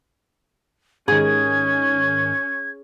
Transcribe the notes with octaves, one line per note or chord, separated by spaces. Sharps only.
G#2 D#3 C#4 G#4 G#6